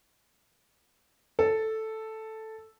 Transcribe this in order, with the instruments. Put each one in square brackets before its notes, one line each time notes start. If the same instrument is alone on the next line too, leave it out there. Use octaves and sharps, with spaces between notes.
[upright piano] A4